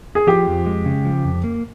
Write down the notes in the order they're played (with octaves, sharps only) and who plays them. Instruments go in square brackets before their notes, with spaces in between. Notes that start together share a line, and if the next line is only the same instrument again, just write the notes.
[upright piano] G#4
[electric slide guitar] F3 [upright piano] G4
[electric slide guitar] F2
G#3
C#3
F3
F2
A#3